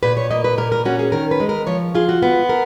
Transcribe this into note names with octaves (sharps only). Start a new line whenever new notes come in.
A#2 B4
C#5
A#3 D#5
B4
A#2 A#4
A#4
C#4 F#4
G#4
D#3 A#4
B4
G#3
A#4
F3 C#5
F4 G#4
F#4
B3
A#4